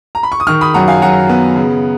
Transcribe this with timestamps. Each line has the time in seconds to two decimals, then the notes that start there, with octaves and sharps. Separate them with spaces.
0.15 A#5
0.23 B5
0.32 C#6
0.40 D#6
0.47 D#3 C#6 F6
0.61 B5 D#6
0.74 F#2 F#5 A#5
0.88 F5 G#5
1.02 F#3 F#5 A#5
1.29 B3
1.56 C#3